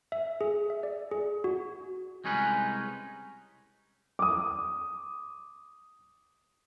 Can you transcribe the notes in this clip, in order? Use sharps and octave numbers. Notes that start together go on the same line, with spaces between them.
E5
G#4
E5
D5
G#4
F#4
C2 G#3 C#4 D#4 B4
D6 D#6